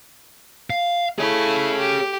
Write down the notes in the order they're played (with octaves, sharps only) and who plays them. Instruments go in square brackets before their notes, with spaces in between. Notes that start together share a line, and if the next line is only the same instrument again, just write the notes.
[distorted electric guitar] F5
[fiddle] A3 E4 [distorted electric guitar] G#4 C#5
[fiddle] G4